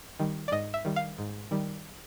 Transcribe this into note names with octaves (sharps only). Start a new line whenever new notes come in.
D#3 G3
D5
G#2 D#5
E5
D#3 G3
F5
G#2
D#3 G3